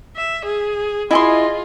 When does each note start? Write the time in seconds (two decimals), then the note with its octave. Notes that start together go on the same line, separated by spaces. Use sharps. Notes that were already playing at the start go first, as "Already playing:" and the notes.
0.16 E5
0.46 G#4
1.11 E4 F4 G#4 D#5 G#5 C6